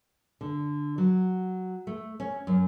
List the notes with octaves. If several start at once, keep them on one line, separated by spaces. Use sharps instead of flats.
D3
F#3
A3
C#4
F#2